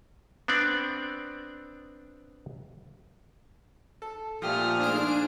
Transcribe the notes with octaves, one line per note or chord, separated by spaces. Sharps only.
B3 C4 D4 D5
A4
A#2 F3 A3 F4 G4 A4 D#6 F6
G#2 D4 G#4 C5 D7